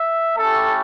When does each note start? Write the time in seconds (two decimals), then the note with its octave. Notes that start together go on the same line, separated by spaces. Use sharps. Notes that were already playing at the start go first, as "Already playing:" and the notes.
Already playing: E5
0.37 A3 C#4 E4 G4 A4